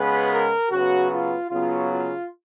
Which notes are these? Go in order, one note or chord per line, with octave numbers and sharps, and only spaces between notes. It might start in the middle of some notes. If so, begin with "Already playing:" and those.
Already playing: C#3 G#3 B3 B4
A#4
C#3 F#3 B3 F#4
F4
C#3 F#3 B3 F4
F4